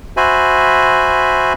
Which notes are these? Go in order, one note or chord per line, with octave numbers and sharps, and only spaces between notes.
F#4 C5 E5 G#5 B5